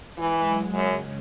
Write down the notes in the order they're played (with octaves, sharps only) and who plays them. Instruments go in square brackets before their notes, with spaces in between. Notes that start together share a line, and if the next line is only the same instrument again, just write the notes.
[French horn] E3 [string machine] G#3
[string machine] F#3
[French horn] F#2 [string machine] C#3